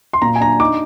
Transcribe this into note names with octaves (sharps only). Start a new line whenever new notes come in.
C6
A#2 A#5
G#5
D4 A#5
D#4 D6